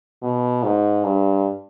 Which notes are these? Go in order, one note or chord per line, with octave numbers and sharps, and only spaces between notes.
B2
G#2
G2